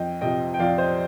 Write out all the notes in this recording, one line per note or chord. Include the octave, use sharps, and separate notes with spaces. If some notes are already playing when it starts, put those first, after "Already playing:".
Already playing: F2 D#5 G5
C3 F3 D#5 G5
G5
F2 D5 F5
C5 D#5